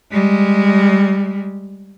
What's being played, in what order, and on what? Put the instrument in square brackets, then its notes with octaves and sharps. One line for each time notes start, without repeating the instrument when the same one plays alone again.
[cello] G3 G#3